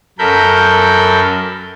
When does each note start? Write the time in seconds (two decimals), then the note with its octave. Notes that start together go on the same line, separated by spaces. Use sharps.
0.19 F#2 A4 A#4 B5 G6